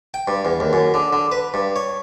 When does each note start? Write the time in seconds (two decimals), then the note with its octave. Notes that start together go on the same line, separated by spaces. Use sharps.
0.14 G5
0.28 G2
0.45 E2
0.60 D#2
0.73 F#2
0.94 D3
1.13 D3
1.32 B4
1.54 G2
1.76 C#5